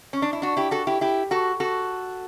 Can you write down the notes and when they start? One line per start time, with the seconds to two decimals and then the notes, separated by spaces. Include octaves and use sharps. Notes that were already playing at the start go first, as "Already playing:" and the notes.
0.13 C#4
0.22 D4
0.33 E4
0.42 D4 F#4
0.57 E4 G4
0.71 F#4 A4
0.87 E4 G4
1.01 E4 G4
1.31 F#4 A4
1.60 F#4 A4